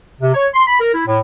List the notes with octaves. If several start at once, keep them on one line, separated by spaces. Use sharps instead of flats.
C3
C#5
C6
B5
A#4
E4
A2